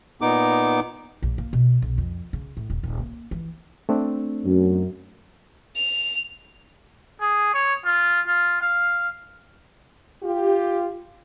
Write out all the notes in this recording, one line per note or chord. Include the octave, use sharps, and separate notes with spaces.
A#2 B3 D#4 D6
A#1
A#3
B2
B1
F2
C#3
A2
D#1
D#1
A#3
E3
A3 C4 D4
F#2
F7
G#4
C#5
F4
F4
F5
F4 G4